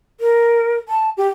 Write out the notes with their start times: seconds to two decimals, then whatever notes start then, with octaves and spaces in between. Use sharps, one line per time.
0.20 A#4
0.89 A5
1.17 G4